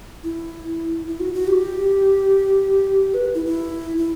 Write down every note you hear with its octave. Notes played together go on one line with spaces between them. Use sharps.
E4
E4
F#4
F#4
G4
B4
E4
E4
E4